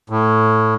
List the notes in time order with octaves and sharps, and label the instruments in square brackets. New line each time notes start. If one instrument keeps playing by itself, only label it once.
[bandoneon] A2